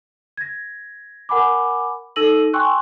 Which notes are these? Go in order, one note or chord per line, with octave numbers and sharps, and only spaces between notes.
G#6 A#6
A#4 F#5 G#5 B5 D6
D#4 A4 E6 A#6 D#7 F#7
G5 G#5 C6 C#6 E6 F#6